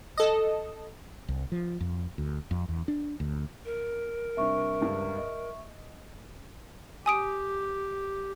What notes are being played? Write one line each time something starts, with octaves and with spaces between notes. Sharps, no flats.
A4 D#5
C2
F3
F2
D2
F2
E2
D4
D2
A#4
C3 G3 D4 E5 C#6
C#2 G2
D#5
G4 G#5 D#6 D7